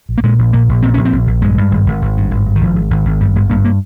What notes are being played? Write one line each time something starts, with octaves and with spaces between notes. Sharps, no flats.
A#1
A#3
A#2 G#3
A#1
A#2 A#3
A#1
A#2 C4
A#1 C#4
C4
A#1
A#1
G2 G#3
G2
G#1
G#1
G#1
G2
G#1
G2
D#3
G#1 F3
G#1
G#1
G#1
G2 G3
G#1 G#3
G2 A#3
A#3